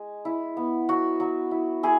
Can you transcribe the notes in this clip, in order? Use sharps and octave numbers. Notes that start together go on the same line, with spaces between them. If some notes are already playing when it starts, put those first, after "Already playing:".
Already playing: G#3
E4
B3
F#3 F#4
F#3
E4
E4 G#4